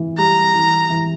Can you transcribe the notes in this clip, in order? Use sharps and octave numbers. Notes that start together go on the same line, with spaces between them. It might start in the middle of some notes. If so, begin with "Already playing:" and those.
Already playing: E3
G3 A#5
E3
E3